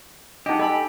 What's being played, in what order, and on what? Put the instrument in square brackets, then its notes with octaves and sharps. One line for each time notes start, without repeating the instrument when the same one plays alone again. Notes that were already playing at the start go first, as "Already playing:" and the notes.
[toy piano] D4 D#4 [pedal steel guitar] G4 [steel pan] D#5 F#5
[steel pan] A4 B5 [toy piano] D#5 G#5